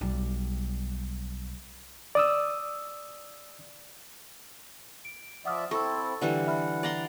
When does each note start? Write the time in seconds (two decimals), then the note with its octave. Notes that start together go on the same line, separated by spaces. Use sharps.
0.01 B1 G3
2.15 D5 D#6 E6
5.05 D7
5.45 F3 D5 E5 F#5 D#6 F6
5.71 C4 E4 A4 C#6 E6
6.21 D3 E3 G3 F#5
6.47 E5 B5 F6
6.83 D5 A#5 C6